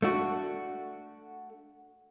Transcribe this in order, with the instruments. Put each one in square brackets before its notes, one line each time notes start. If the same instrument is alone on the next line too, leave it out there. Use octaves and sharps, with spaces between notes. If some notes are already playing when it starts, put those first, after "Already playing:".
[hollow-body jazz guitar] A3 D4 F#4